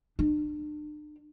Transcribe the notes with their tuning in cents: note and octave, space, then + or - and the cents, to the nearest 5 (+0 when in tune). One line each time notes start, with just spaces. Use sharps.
D4 +40